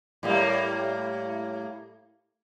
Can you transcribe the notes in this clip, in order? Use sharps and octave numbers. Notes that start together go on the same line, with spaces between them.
A2 G3 A#3